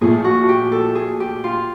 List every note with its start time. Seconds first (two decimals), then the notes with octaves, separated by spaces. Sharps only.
0.01 A#2 F3 A3 G#4
0.24 F#4
0.49 G4
0.72 A4
0.95 G#4
1.20 G4
1.44 F4